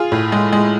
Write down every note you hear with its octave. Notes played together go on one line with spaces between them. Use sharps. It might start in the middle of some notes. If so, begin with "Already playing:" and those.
Already playing: F4 G#4
A2
G#3
G#3